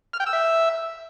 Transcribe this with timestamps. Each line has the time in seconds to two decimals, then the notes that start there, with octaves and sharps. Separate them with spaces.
0.13 F6
0.20 G5
0.26 E6
0.33 E5